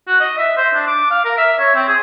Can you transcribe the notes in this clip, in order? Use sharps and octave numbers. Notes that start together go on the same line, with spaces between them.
F#4
D#5
E5
C5
D4
D6
F5
A#4
E5
C#5
C4
G#4